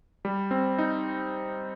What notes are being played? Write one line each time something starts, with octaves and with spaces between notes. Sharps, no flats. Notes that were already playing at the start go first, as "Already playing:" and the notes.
G3
C4
D#4